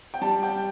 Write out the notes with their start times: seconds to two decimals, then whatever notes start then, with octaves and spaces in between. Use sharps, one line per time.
0.14 G5
0.21 G3 A5
0.43 G5